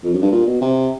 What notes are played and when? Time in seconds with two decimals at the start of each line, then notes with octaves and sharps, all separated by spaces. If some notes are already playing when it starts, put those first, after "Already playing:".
0.04 F2
0.13 F#2
0.22 G2
0.32 A#2
0.47 B2
0.61 C3